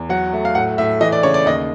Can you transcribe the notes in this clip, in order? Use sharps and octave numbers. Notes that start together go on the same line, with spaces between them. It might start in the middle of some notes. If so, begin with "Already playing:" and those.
Already playing: E2
F#3 F#5
A3
F5
A2 F#5
A2 E5
E3 D#5
D5
C#3 C#5
D5
D#2 D#5